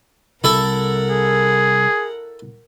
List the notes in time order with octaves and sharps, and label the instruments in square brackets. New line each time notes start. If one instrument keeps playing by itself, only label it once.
[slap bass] C3 G3 [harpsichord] E4 A4 [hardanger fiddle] A#4 F#5
[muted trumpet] G#4